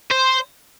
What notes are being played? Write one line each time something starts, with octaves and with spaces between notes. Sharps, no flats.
C5